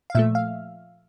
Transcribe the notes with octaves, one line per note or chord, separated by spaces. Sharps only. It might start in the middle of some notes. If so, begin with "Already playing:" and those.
F5
A#2 F3 A3 E5
F5